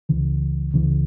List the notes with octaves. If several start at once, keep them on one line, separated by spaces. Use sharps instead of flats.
C#2 C#3 E3
C#2 C#3 E3